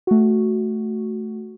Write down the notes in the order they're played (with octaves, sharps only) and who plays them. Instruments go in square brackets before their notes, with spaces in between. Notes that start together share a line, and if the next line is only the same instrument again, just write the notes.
[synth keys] A3 F#4